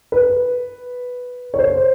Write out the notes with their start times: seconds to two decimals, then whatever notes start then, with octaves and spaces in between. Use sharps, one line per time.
0.12 B4
1.54 C#5
1.59 C5